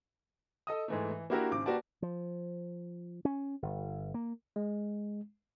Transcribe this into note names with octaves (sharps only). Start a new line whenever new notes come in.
A4 D#5 D#6
G#2 E3 A3
E3
A#3 D4 E4 F#4 G4 A#4
G#1 C#3 D6
A#3 F#4 G4 B4 D5 A5
F3
C#4
G1
A#3
G#3